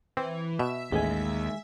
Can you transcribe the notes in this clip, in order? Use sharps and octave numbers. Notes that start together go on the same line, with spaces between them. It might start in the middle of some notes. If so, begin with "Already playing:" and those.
E3 C4
B2 E5
A1 D#2 G#3 G#5